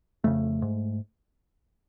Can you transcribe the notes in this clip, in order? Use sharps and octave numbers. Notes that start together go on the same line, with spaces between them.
F2 C#3 A3
G#2